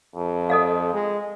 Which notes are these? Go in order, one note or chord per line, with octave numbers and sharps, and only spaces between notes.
F2
A4 D#5 F5
G#3